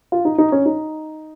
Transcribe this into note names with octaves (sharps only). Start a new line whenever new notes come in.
F4
D#4
D#4
C#4
D#4